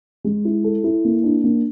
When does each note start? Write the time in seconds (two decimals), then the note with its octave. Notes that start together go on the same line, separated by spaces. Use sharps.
0.24 G#3
0.45 E4
0.64 A4
0.84 E4
1.05 A#3
1.24 D4
1.44 A#3